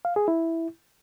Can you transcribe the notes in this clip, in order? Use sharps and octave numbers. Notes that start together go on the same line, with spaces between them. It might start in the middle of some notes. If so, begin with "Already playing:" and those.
F5
G#4
E4